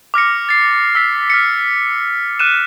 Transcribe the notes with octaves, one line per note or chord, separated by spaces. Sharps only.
D6 F6 A#6 C#7
A6 C7
E6 B6 C7
F6 B6 C#7
F6 F#6 D#7 E7